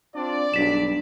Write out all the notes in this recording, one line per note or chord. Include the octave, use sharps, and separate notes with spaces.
C4 D4 F4 D5
B1 G2 D4 B6 E7